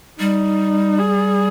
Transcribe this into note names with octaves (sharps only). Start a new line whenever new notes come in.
G3 D#4
G#4